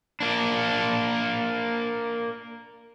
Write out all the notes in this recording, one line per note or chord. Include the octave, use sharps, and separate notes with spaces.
A#3 D4